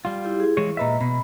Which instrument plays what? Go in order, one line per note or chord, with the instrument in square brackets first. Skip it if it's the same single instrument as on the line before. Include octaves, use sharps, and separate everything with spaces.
[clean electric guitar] G3 F4
[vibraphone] E4 G4
E4 G#4
[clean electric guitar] E3 G#3 C#5
[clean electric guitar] A#2 B4 E5 [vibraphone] D#5 A#5
[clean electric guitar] B2 [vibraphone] B5